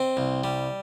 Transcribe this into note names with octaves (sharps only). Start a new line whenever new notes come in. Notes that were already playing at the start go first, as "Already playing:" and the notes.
Already playing: C4 D#5
C2
G3